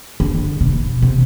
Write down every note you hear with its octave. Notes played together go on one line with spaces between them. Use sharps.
D3
B2
C3